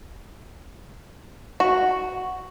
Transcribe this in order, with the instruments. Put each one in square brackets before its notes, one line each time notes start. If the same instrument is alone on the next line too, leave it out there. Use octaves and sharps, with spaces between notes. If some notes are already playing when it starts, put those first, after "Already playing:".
[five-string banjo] F#4